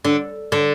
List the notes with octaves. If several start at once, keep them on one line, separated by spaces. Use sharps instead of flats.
D3
D3